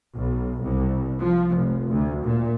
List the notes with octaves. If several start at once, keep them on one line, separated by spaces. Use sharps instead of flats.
B1
C2
F3
F1
D2
A#2